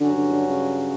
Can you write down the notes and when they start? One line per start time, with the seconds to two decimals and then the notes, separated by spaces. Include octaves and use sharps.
0.01 G2 D3 F#3 C#4 F#4
0.17 D3
0.33 D3
0.49 C#3